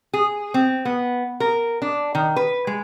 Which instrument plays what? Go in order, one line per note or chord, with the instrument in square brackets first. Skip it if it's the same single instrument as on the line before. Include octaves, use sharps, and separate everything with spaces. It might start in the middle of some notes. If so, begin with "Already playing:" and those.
[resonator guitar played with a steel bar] G#4
C4
B3
A#4
D4
D#3
B4
G#3